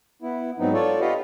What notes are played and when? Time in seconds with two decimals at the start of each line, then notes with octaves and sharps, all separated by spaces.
0.22 B3 E4
0.59 G#2 F#3 B3 C4 D#4
0.73 F4 A4 C#5 D5
1.00 F4 G4 B4 D#5 F5 F#5